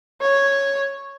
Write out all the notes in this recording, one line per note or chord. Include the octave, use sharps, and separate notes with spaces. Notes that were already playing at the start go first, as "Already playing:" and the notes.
C#5